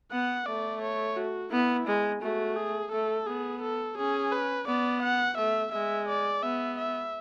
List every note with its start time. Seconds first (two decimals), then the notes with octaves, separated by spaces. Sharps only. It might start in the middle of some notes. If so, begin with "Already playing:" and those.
0.11 B3 F#5
0.46 A3 D5
0.82 C#5
1.17 F#4
1.52 B3 E4
1.87 G#3
2.22 A3 F#4
2.56 G#4
2.92 A3 A4
3.27 B3 G#4
3.62 A4
3.97 C#4 G#4
4.33 B4
4.67 B3 D5
5.03 F#5
5.37 A3 E5
5.72 G#3 E5
6.08 D5
6.43 B3 E5
6.78 E5